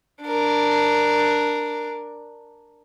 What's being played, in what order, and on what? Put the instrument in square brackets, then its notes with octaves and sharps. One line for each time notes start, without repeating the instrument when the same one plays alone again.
[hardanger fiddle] D4 A#4